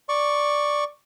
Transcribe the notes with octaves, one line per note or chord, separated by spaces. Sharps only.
D5 C#6